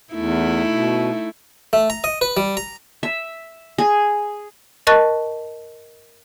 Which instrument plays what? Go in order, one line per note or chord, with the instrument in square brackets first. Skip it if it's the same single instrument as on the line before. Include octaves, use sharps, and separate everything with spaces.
[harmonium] E2 [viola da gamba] A3 D#4 E4
[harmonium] B2
[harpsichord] A3
A#5
D#5
B4
G3
A#5
[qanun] E5
G#4
[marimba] A#4 D#5 A5 C#6 F#6 A6